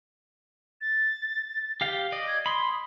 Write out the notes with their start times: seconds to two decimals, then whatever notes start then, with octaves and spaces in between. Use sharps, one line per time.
0.81 A6
1.81 G4 F5 G5
2.12 D5 D#5
2.28 G#6
2.46 B5 C6 D#6